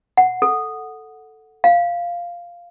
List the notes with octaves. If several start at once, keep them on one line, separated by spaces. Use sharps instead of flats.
F#5
A4
F5